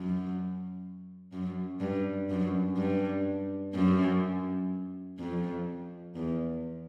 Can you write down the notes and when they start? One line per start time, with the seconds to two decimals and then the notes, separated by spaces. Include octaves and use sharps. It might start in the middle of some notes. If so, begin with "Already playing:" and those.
Already playing: F#2
1.33 F#2
1.80 G2
2.29 F#2
2.77 G2
3.74 F#2
5.19 F2
6.15 E2